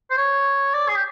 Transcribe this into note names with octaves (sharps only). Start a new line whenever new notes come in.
C5
C#5
D5
G#4
G4